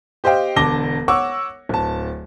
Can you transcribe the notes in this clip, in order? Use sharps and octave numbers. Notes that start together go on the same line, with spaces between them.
G4 C5 D#5 F5 G5
E1 D3 A5 D6 A#6 G7
C#5 F#5 C#6 D6 E6
D1 A5